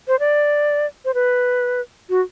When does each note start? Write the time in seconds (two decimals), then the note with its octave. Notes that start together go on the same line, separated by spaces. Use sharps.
0.08 C5
0.20 D5
1.05 C5
1.14 B4
2.10 F#4